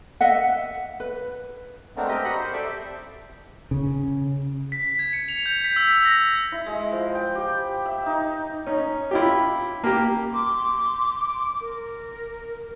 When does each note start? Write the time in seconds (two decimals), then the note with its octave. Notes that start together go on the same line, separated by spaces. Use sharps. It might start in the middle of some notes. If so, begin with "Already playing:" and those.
0.21 D#5 E5 F#5
1.00 B4
1.97 G#3 A3 B3 C4 D4 A#4
2.08 C4 G4 A#4 D#5
2.24 F#4 D#5 F#5 B5 D#6
2.39 C5
2.53 G4 A4 D5 E5 G5
3.71 C#3
4.72 B6
4.99 G#6
5.13 C#7
5.28 F7
5.46 G6
5.64 B6
5.76 E6
6.05 A#6
6.52 E4
6.66 G#3
6.92 F3
7.15 G5
7.35 G4
7.50 B5
7.86 E5
8.06 D#4
8.67 C#4 D#4
9.11 E4 F4 G4
9.84 A#3 G4
10.33 C6 D6
11.59 A#4